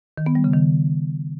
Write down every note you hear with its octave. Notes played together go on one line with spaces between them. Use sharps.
D#3
B3
G3
C#3
D#3